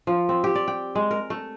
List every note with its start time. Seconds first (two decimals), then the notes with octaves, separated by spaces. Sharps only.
0.07 F3
0.29 C4
0.44 G4
0.55 D5
0.68 G5
0.95 G#3
1.11 A#4
1.30 A3